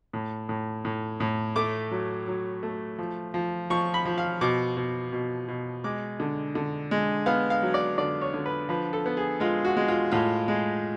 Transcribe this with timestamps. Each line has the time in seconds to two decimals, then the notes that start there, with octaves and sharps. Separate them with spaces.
0.13 A2
0.49 A2
0.85 A2
1.20 A2
1.56 A3 D6
1.91 F#3
2.28 F#3
2.63 A3
2.99 F3
3.34 F3
3.70 F3 C#6
3.94 B5
4.05 F3
4.18 F5
4.41 B2 D6
4.77 B2
5.13 B2
5.48 B2
5.84 G#3 D6
6.20 D3
6.55 D3
6.91 G#3
7.26 B3 F5
7.50 F5
7.62 F#3
7.74 D5
7.98 D3 D5
8.21 C#5
8.34 D3
8.46 B4
8.69 F3 B4
8.93 A4
9.06 B3
9.17 G#4
9.40 G#3 F4
9.64 F#4
9.77 G#3
9.88 F4
10.12 A2 F4
10.48 G#3